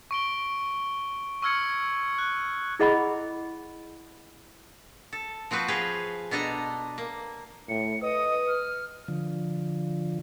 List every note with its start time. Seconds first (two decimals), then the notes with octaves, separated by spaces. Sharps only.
0.11 C#6 D7 G7
1.42 C#6 E6 F6 G#6 C#7
2.18 F#6
2.80 E4 G#4 D#5 F#5 B5
5.13 A4
5.51 F3 C4 F#4 B4 C5
5.68 G#4 B4 F5 G5
6.31 B2 D4 A4 D#5 A#5
6.98 A#3
7.69 A2 C#7
8.02 B4 D#5 D#6
8.48 F6
9.08 D3 F3